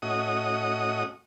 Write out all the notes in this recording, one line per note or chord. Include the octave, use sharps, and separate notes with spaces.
A2 C#4 F#4 D#5 D#6